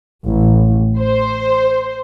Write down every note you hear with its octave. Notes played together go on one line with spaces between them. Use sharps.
A1
C5